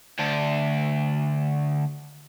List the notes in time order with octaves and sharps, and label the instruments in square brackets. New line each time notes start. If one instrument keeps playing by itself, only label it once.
[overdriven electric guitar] D2 D4